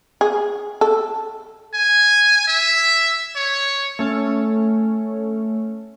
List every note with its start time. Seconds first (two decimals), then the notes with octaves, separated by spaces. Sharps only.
0.21 G#4
0.81 A4
1.74 G#5
2.47 E5
3.36 C#5
3.99 A3 C#4